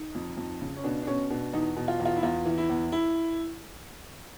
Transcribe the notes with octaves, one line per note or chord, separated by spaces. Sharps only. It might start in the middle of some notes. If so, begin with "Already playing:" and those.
Already playing: D#4
F2
F2
C#3
C#4
B2 D4
D4
B2 C#4
B2 D4
E2 D#4
B2
F4
E2
F4
E4
E2 F4
E3
E4
E2
E4